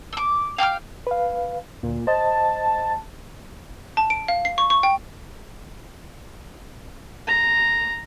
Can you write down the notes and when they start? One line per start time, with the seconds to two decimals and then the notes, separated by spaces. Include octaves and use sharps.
0.13 D6 E6
0.58 F5 G5 D6 F6
1.07 B4 F5
1.83 D2 A#2
2.07 C5 D#5 A5
3.97 A5
4.10 D7
4.28 F5
4.45 C7
4.58 C#6
4.70 C#6
4.83 G5
7.27 A#5